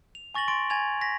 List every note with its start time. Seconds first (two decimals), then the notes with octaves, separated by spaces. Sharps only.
0.15 F7
0.35 G#5 C#6 A6 A#6 F#7
0.48 C6 A6 D7
0.70 G#5 G#6 A6 F7
1.01 A#6 B6